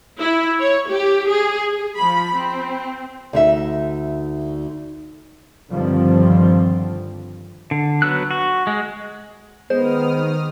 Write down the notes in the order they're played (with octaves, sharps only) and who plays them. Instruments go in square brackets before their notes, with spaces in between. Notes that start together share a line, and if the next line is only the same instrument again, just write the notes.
[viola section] E4
C#5
G4
G#4
F3 B5
C4
[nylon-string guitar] D2 D#4 E5
[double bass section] G2 D3 D#3 F3 G3 C4
[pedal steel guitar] D3
F#3 B3 E6 F#6
F#4
G#3
[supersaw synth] D#3 D#6 F6 [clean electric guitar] G#3 [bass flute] B3 [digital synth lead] C5